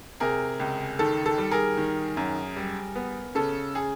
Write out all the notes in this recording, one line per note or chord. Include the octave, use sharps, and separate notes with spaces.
C3 G#4 A#4
C#2
D#3 A4
A4
G3
G#4 A#4
D#3
F#2
G3
B3
C#3 A4
G#4